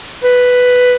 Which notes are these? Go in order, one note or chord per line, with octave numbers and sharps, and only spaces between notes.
B4